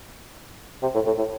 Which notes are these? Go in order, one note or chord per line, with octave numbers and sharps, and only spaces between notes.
C3
A2
A2
A2